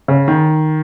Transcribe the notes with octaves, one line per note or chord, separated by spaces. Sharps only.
C#3
D#3